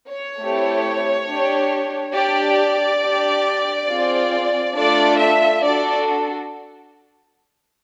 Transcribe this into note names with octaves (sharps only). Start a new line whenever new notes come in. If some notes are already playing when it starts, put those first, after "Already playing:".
C#5
A3 C4 E4 G4
D4 G4
D4 G4 D5
D4 G4
C4 F4 G#4
A3 D4 F4 A4 D5
E5
D4 F#4 A4 D5